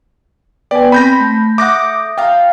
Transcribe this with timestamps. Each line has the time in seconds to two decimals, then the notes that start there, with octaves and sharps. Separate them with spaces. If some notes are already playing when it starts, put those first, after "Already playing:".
0.71 B3 B4 D5 G5 G#5
0.92 C4 C5 G#5 B5 G6 A#6
1.20 A3
1.58 A3 E5 F#5 D6 D#6 G6 A#6
2.18 F4 F5 G5 A#5